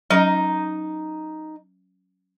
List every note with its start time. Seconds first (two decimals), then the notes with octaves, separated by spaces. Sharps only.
0.10 F#3 C#4 D#4 D#5